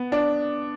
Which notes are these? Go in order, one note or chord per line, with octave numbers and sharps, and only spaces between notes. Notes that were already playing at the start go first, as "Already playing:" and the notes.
Already playing: B3
D4